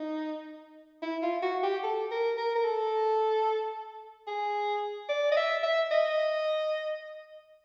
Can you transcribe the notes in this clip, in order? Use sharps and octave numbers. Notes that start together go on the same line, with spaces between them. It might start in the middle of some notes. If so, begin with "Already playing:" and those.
Already playing: D#4
E4
F4
F#4
G4
A4
A#4
A#4
A#4
A4
G#4
D5
D#5
E5
E5
D#5